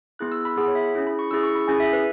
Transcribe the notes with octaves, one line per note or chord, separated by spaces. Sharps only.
B3 E4 G#4 F#6
E6
B5
B3 E4 G#4 F#5
C#5
E5
C#4 E4 G#4
B5
C#6
C#4 E4 G#4 E6
C#6
B5
C#4 E4 G#4 G#5
E5
B4